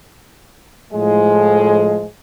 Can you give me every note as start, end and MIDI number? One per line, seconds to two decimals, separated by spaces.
0.93 2.06 45
0.93 2.06 53
0.93 2.06 56